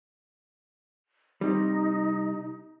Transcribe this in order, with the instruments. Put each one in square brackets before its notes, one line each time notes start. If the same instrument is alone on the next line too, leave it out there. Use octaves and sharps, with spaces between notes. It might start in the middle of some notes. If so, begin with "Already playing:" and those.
[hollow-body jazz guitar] C3 G3 [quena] D#4